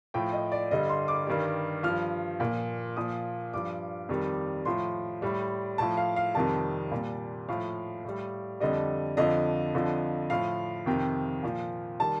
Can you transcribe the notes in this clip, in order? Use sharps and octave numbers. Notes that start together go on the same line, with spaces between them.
A2 F3 G5
D#5
D5
G2 D3 G3 D#5
C6
D6
G2 D#3 G3
G2 F3 F6
A#2
F3
A#2 F3 D#6
G2 F3 D6
F2 D#3 G3
A2 F3 C6
A2 G3
A2 F3 A5
F5
F5
F2 C3 D#3 G3 A5
A#2 G3
A2 F3 F5
A2 G3
F2 D3 G3 D#5
F2 D3 F3 D#5
F2 D3 F3
A2 F3 F5
F2 C3 D#3 G5
A#2 F3
D#3 G3 A5